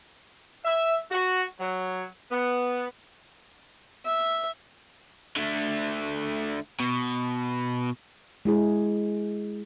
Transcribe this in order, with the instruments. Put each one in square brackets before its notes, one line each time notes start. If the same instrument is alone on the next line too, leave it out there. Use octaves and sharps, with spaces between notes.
[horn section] E5
F#4
F#3
B3
[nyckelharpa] E5
[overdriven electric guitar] D3 A3
B2
[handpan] G#3 E4 G#4